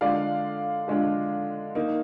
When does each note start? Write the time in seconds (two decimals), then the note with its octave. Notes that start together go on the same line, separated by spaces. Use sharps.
0.01 D3 G#3 D4 F4 D5 F5
0.88 D3 G#3 D4 F4
1.75 D#3 A#3 D#4